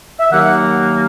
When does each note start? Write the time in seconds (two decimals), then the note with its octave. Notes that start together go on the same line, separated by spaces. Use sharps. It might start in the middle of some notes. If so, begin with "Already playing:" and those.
0.20 E5
0.30 D#2 D#3 F#3 A#3 F#5